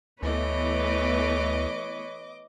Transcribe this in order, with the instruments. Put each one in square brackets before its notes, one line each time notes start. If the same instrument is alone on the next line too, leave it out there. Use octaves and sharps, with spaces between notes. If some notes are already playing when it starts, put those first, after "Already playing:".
[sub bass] D2 [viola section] E3 A3 B3 [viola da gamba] B4 C#5 [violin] D#5 D6